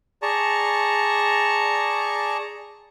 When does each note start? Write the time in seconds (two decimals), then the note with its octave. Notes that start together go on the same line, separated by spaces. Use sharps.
0.22 G#4 D5 A5 A#5 C#6